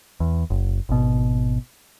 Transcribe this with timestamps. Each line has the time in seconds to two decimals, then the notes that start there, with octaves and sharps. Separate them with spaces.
0.20 E2
0.50 F#1
0.89 G#1 B2